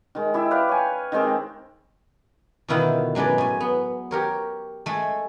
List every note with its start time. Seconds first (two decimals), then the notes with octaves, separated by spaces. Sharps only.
0.15 D#3 G#3
0.34 E4 G4 E5
0.51 B4 D5 F5 G5
0.69 C#5 G#5
1.12 D#3 G#3 C4 G4
2.68 B2 D3 D#3 E4 F4
3.15 F#3 G#3 D4 B4 D5
3.38 A2 G#5
3.60 B3
4.11 G4 A#4 C#5
4.86 G#3 A3